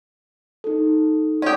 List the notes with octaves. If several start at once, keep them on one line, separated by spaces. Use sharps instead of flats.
D#4 A4
C#4 G4 D5 D#6